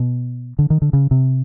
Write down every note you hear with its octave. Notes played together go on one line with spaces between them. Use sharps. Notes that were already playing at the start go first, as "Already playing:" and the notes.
Already playing: B2
D3
D#3
D3
C#3
C3